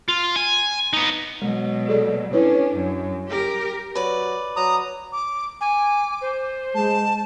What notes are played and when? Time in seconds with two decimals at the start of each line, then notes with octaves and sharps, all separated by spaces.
0.08 F4
0.36 G#5
0.93 B3 D#4
1.42 B2 F#3 G#3
1.89 G#4 A4 D5
2.33 C#4 D4 E4 B4 C#5
2.75 F#2
3.27 G4 A#4
3.95 F#3 B4 D5
4.56 F#3 A#5 D#6
5.12 D6
5.61 G#5 D6
6.21 C5
6.75 G#3 A5